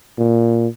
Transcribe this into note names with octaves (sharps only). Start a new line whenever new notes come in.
A#2